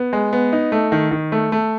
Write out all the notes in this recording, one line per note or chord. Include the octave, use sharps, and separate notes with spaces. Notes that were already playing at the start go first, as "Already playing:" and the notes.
Already playing: B3
G#3
B3
D#4
A3
D#3
D#3
A3
A3